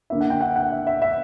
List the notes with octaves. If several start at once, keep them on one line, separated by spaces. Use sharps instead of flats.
D3 A#3 E4 E5
F#5
G5
F#5
F#5
E5
E5
E5